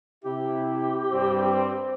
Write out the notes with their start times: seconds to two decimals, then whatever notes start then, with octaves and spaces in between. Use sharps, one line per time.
0.24 C3 E4 G4
1.12 G2 G3 C4